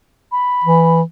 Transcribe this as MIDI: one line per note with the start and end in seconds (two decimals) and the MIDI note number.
0.32 1.01 83
0.64 1.02 52